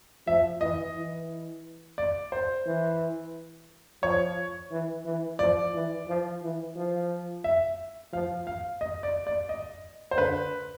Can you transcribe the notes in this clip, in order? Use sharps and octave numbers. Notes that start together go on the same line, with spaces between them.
F3 E5
E3 D#5
E3
D5
C5
E3
F3 C#5
E3
E3
F3 D5
E3
F3
E3
F3
E5
F3 F5
F5
D#5
D5
D5
D#5
C5
D3 B4